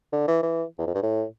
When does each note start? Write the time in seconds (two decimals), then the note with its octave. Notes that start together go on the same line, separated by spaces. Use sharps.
0.13 D3
0.28 E3
0.42 E3
0.78 E2
0.87 F2
0.95 G2
1.03 A2